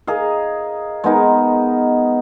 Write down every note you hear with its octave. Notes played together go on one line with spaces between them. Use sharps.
G#4 A#4 D#5 F5
G#3 B3 D#4 A#4